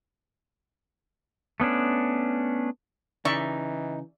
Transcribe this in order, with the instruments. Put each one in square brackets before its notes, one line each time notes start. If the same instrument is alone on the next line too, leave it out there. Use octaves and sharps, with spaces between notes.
[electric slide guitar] A3 B3 C#4 D4
[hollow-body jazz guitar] C#3 [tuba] E3 [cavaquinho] D#4 [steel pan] D5 E5 C#6